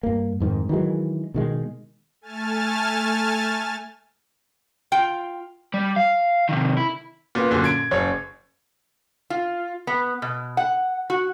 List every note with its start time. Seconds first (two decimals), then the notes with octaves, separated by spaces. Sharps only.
0.03 G2 A#3
0.40 F2 G#2 D#3
0.69 D#3 E3 F#3 G#3
1.34 B2 D#3 G#3
2.21 A3 G#5 A5 F6 A6
4.92 F4 G5
5.74 G3
5.96 F5
6.49 C3 D#3
6.77 E4
7.35 A#2 B3
7.51 F#2 A#2 D3
7.64 G#6 D7
7.91 F#1 C#5
9.30 F4
9.87 B3
10.22 B2
10.57 F#5
11.10 F#4